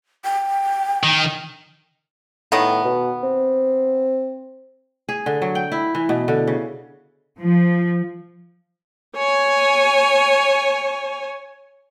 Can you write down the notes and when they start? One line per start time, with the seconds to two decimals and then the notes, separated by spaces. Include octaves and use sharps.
0.25 G5
1.03 D#3
2.52 A2 D#3 B3
2.85 B2
3.23 C4
5.09 G#4
5.26 D3
5.42 F#3
5.55 G5
5.72 E4
5.95 E3
6.09 B2
6.28 D3
6.47 C#3
7.38 F3
9.17 C#5 G#5